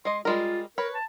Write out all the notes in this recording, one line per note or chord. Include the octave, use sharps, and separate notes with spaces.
G#3 D#5 C6
G3 G#3 F4 A#4
A#4 B4 C#5
A5